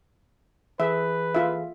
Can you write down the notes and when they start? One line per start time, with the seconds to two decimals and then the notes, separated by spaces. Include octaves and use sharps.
0.80 E3 G#4 B4 E5
1.35 F4 E5